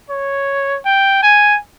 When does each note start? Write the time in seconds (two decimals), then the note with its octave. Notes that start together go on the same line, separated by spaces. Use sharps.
0.10 C#5
0.85 G5
1.23 G#5